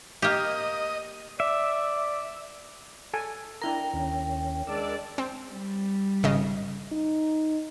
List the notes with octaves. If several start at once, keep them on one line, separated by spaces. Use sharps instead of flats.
A#3 G4 D#5
D5 E5
A4 G#5
D4 E4 A#4 G5 A#5
D#2 C#4
G#3 D4 A#4 D5 D6 E6
C4
G3
G#1 C#3 D#5
D#4